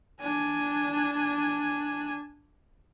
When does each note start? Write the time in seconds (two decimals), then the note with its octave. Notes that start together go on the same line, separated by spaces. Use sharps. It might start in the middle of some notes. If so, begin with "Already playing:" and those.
0.20 D4 G#5